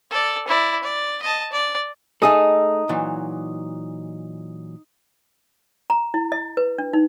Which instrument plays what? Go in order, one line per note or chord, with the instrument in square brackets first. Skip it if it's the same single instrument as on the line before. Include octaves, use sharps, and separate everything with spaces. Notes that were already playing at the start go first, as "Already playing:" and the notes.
[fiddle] A4 D5
E4 D5
D5
D#5 A5
D5
[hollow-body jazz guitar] A3 G#4 A4 [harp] D#4 D#6
[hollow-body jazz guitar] A#2 E3 F#3
[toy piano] A#5
E4
D#5
B4
D4
D#4